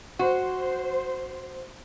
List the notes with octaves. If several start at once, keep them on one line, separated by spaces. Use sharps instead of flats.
F#4 C5